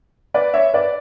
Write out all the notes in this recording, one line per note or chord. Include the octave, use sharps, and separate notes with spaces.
B4 D5
C#5 E5
B4 D5